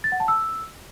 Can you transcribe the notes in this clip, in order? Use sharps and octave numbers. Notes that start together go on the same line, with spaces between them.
A6
F#5
A5
E6